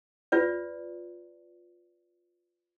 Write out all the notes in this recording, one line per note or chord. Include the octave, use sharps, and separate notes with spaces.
F4 B4 D5